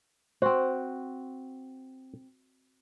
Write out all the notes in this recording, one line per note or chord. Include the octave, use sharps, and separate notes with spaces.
C4 F#4 C5